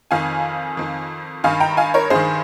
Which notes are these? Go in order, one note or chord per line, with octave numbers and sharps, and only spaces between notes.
F2 D#3 F5 G#5
F2 D#3
G2 D#3 F5 G#5
G5 A#5
F5 G#5
A#4 C#5
G2 D#3 G#4 C5